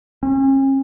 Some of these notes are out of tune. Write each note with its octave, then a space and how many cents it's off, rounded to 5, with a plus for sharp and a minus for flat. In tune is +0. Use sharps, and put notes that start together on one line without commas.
C#4 -40